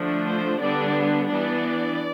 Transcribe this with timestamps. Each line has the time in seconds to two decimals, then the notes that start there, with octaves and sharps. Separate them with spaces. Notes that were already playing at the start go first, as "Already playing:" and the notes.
Already playing: D3 F3 A3 D4
0.27 C5
0.60 D3 G3 B3 D4 D5
1.28 E3 B3 D4 D5